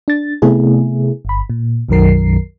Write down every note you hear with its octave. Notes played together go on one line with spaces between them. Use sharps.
D4 A6
C3 A3 B3 E4 G#4
G1 B5
A#2
B1 F#2 D#3 F#3 A#4 C7